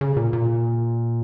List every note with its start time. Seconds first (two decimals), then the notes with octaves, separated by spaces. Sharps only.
0.01 C#3
0.17 A#2
0.33 A#2